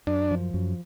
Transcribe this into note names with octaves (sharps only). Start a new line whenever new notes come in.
F#2 D4
F3
F#2